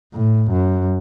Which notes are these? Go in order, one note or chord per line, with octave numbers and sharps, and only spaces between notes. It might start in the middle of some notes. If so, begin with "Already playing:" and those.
A2
F#2